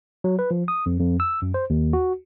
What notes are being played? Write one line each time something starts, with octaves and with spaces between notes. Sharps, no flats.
F#3
B4
F3
D#6
F2
F2
E6
F#2
C5
D#2
F#4